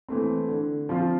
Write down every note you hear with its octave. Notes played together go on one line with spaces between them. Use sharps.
E3 A3 C4
D3
F3 C4 F4